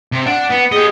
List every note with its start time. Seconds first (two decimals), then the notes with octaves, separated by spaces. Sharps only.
0.12 C3
0.26 D4 F#5
0.50 B3
0.72 G4 G#4 D#5